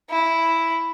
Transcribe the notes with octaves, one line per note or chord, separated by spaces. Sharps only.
E4